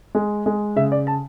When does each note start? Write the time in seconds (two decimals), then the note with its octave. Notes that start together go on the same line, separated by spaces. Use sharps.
0.15 G#3
0.46 G#3
0.76 C#3 E5
0.92 D5
1.07 A5